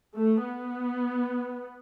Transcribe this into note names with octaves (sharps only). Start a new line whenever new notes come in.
A3
B3